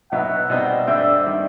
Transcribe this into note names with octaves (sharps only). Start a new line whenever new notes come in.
B2 F#3 B3 D#4 E5 F#5
B2 G3 C4 D#4
G2 D3 G3 C4 D5 E5
D#3 G3